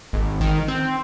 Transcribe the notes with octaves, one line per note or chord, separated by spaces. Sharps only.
G#1
D#3
C4